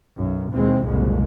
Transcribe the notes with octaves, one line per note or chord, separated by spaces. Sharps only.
B1 F#2
D#2 B2 E3 G#3 C4
F#1 C2 F2 A#2 G#3